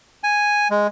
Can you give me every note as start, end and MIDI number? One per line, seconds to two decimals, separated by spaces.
0.24 0.68 80
0.70 0.87 56